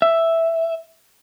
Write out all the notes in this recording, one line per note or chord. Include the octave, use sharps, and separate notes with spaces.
E5